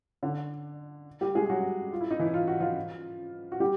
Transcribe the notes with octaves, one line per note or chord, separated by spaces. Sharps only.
D3 D4
G3 G4
G#3 G#4
F#3 F#4
F4
E4
D#4
E3 E4
F4
F#4
F3 F4
F#4
G3 G4